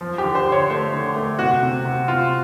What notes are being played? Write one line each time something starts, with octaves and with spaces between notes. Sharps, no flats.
F3
G4
D3
C5
D3
C#5
A3 C5
D3
A3
C3 F#4
C3
C3
C3 F4